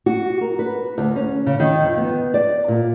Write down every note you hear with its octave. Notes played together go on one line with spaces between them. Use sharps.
F#4
A#4
B4
D2
C#4
C#3
D#3
F2
B3
D5
A#2